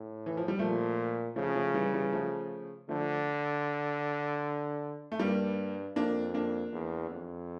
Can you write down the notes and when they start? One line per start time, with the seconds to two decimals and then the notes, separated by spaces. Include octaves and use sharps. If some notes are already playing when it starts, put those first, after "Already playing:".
Already playing: A2
0.26 E3
0.37 F3
0.48 G3
0.59 A#2 F3 A3
1.36 C#3 F3 A3
1.55 F3 A3
1.74 E3 G3
1.94 E3 G3
2.13 F3 A3
2.89 D3 F3 A3
5.12 A3
5.19 G2 G3 A#3
5.96 F2 A#3 D4
6.34 A#3 D4
6.72 E2
7.11 F2